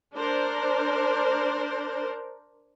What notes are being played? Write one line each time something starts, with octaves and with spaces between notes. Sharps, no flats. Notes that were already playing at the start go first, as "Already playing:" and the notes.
D4 A#4 C5